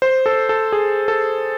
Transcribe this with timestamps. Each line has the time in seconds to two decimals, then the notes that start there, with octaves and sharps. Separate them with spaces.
0.02 C5
0.26 A4
0.49 A4
0.72 G#4
1.08 A4